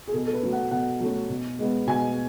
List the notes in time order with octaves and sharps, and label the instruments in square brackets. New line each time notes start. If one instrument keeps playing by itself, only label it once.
[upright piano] G#4
B2 A4
A4
B4
F#3 A3 C#4
F#5
B2 F#5
F#3 A3 C#4
B2
G#3 B3
B2 G#5